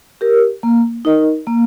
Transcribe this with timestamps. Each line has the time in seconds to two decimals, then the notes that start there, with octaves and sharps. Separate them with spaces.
0.21 G4 A#4
0.63 A#3
1.05 D#4 A#4 D#5
1.47 A#3